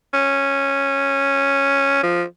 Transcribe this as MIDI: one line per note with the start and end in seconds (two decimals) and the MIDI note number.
0.14 1.99 61
2.03 2.23 53